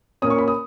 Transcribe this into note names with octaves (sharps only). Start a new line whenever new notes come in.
A#2 A#3 C#4 D#6
C#6
B5
D#6